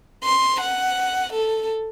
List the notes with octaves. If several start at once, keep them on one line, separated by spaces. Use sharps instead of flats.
C6
F#5
A4